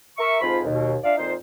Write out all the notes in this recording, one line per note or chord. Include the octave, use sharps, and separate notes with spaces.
A#4 E5 C#6
F2 G#2 F3 F4 B5
D#2 B2
D4 F4 D5 E5 F5
F2 A#2 D#4 F4 C5